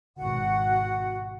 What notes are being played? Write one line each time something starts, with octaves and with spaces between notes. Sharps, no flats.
G#1 B2 F#4 F#5